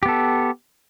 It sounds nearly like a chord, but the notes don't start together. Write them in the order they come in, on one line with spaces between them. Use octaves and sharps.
G4 B3 A4